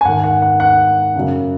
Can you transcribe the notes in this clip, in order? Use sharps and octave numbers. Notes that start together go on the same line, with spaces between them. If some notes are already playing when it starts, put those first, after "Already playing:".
G#5
G#2 D#3 F#5
F#5
F#5
F#5
F#2 C#3